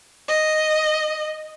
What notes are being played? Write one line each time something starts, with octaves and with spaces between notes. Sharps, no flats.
D#5